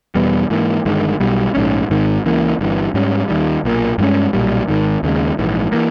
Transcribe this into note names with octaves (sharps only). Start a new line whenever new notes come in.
E2 B2 G3 B3
G#2 E3 A#3
G1 G2 D#3 G#3
B1 B2 G3
A#1 G#2 G3 C#4
G#1 G#2 D#3
C#2 C#3 E3 A#3
G1 G2 E3
G#2 G3 C#4
D#2 D#3 G3
B1 A#2 A#3
G2 D#3 G#3 C#4
B1 A#2 G3
G#1 G#2 D#3
D#2 C#3 G#3
A#1 G#2 E3
E3 A#3